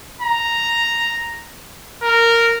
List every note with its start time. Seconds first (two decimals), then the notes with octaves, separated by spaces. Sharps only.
0.22 A#5
2.03 A#4